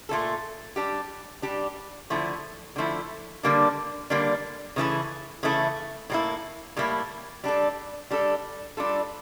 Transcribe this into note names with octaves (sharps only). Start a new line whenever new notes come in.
A#2 A3 C#4 F4 A4
G3 D4 G4
G3 D4 G4
D3 F3 A3 E4
D3 F3 A3 E4
D3 G3 A#3 D4
D3 G3 A#3 D4
C#3 E3 A3 E4
C#3 E3 A3 E4
A2 G3 A#3 E4
A2 G3 A#3 E4
G3 D4 A4
G3 D4 A4
G3 D4 F4 A4